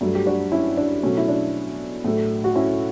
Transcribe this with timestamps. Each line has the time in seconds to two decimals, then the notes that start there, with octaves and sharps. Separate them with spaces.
0.01 G2 F#3 A3
0.15 G4
0.26 D4 F#4
0.52 C#4 E4
0.77 D4
1.03 B2 F#3 A3 C#4
1.17 E4
1.28 D4
2.04 A2 F#3 A3
2.44 F#4
2.55 C#4 E4